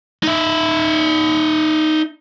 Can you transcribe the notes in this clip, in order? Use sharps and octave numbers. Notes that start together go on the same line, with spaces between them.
D#4 E5